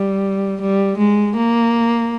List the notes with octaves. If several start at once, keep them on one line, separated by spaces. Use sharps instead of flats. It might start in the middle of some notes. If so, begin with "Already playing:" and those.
Already playing: G3
G3
G#3
A#3